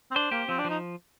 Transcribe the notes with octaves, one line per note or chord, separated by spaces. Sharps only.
C4
D4 C5
A#3 G4
F3 C4
D4
F3
D#4